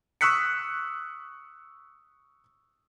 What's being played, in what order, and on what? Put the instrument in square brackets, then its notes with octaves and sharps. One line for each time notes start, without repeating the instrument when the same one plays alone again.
[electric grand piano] C#6 D#6 E6 F#6 B6 C#7